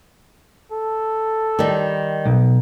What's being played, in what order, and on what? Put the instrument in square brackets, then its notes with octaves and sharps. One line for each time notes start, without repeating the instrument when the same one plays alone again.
[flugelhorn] A4
[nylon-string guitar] D#3 G3
[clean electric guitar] B1